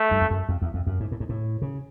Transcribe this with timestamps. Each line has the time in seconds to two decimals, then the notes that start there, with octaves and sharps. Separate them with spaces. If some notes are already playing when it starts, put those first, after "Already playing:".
Already playing: A3
0.11 G2
0.21 F2
0.31 F#2
0.49 F2
0.62 E2
0.74 F2
0.87 F#2
1.00 G#2
1.12 A2
1.20 G#2
1.29 A2
1.62 C#3